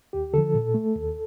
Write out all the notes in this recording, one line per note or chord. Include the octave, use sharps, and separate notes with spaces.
D#2 G4
D3 F3 A4
A#2
A3
D#2